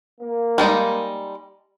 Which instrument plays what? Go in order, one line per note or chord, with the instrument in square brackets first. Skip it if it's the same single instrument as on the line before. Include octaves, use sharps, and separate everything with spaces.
[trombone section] A#3
[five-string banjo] G3 G#3 D#4